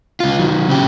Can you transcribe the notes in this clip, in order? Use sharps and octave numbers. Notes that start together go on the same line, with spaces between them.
C#2 F4
D#3 F#3
C#3 G4